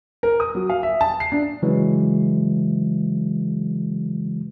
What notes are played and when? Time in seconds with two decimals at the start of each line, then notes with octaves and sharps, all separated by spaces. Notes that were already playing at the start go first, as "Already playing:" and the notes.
0.23 A#4
0.40 D#6
0.55 F#3
0.70 F5
0.83 E5
1.01 A5
1.20 C7
1.32 D4
1.62 C#3 E3 F#3 G#3